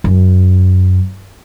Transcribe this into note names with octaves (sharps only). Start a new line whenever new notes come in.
F#2